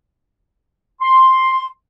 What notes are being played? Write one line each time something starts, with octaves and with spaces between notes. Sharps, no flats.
C6